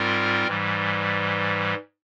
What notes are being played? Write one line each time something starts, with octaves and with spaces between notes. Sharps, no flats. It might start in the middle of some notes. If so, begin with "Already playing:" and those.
Already playing: G#2 G3 C4 F4 A#4
G#2 E3 G3